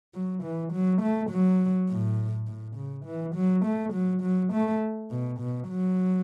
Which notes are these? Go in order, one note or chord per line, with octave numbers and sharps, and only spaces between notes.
F#3
E3
F#3
A3
F#3
A2
A2
C#3
E3
F#3
A3
F#3
F#3
A3
B2
B2
F#3